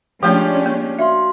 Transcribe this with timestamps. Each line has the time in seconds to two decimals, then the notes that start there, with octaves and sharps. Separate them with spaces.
0.23 F3 G#3 A3 C#4 D4 F4 G4 C#5
0.66 A#3
0.99 F#4 E5 F5 C6